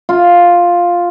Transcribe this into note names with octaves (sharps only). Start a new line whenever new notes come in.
F4